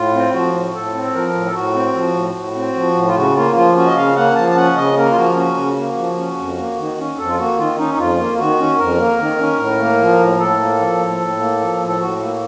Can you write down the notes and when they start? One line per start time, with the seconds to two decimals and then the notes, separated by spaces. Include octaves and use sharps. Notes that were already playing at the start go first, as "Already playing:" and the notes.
Already playing: A2 F4
0.14 C4
0.34 F3 F#4
0.54 A2
0.74 A2 A4
0.94 C4
1.04 A4
1.14 F3 A#4
1.35 A2
1.46 A4
1.54 A2 F#4
1.74 C4
1.95 F3
2.15 A2
2.35 A2
2.55 C4
2.75 F3
2.95 A2
3.07 F4
3.15 C#3 F#4
3.36 A#3 F4
3.56 F3 F4
3.76 C#4 F#4
3.87 D#5
3.96 C#3 F5
4.16 A#3 F#5
4.36 F3 A5
4.49 A5
4.56 C#4 F#5
4.76 C#3 D#5
4.96 A#3 A#4
5.11 F4
5.16 F3 F#4
5.36 C#4 F#4
5.57 C#3
5.77 A#3
5.97 F3
6.17 C#4
6.38 F2
6.57 A#3
6.78 D#3
6.98 C#4
7.18 F2 A4
7.29 F4
7.38 A#3 F#4
7.58 D#3 F4
7.78 C#4 D#4
7.94 D#4
7.98 F2 F4
8.18 A#3
8.38 D#3 F#4
8.59 C#4
8.78 F2 A#4
8.98 A#3
9.19 D#3
9.39 C#4
9.59 A2
9.79 A#3
10.00 F3
10.19 A2
10.39 A2 A4
10.59 A#3
10.80 F3
11.00 A2
11.20 A2
11.40 A#3
11.60 F3
11.80 A2
11.88 A4
12.00 A2 F#4
12.20 A#3